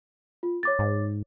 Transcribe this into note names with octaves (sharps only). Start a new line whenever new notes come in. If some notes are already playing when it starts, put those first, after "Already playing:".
F4
C#5 D6 A6
G#2